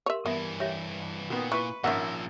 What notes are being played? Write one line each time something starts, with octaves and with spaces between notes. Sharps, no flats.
G4 A#4 C#5 E5 C6
G2 E3 B3 A#4 E5
G4 C#5 E5
A#2 D#3 B3 F#4 D#6
E4 B4 C#6
G#1 A#2 F3 A#3 C#4 E5 F#5